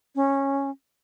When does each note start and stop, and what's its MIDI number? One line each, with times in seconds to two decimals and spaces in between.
0.15 0.70 61